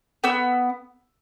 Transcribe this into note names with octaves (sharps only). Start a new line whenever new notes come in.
B3 E6